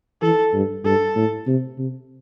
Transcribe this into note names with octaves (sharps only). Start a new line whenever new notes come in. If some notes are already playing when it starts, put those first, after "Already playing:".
E3 A4
G2
G2 A4
A2
C3
C3